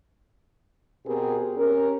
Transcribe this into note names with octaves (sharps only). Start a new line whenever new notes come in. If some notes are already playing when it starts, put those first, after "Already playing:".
B2 C4 G4 G#4 A#4
C#4 G4 A#4